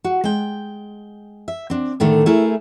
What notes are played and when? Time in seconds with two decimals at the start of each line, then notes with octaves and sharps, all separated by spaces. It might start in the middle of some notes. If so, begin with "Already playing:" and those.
0.04 F#4
0.24 G#3 G5
1.48 E5
1.70 C4 D4
2.00 A2 D3 D#3 A3
2.26 A3 E4 G#4 A#4